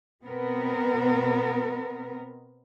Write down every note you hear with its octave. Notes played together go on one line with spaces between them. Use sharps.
B2 B3 C4 A#4